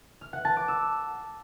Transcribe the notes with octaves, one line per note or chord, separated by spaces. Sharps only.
F6
F#5
A5
D6
E6